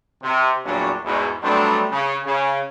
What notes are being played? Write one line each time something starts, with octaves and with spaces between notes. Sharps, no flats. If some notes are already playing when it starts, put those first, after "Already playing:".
C3
E2 A#2 F#3 G3 C#4 D4
E2 G#2 B2
F#3 G3 A3 B3 C4 D4
C#3
C#3